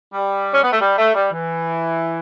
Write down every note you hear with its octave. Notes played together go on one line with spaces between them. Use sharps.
G3
C#4
B3
A3
G3
A3
G3
E3